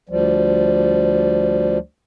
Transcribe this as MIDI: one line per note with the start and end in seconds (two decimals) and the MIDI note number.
0.09 1.78 38
0.09 1.78 53
0.09 1.78 55